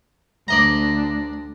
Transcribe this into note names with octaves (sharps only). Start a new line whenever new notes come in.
D2 D4 D5 D#5 A#5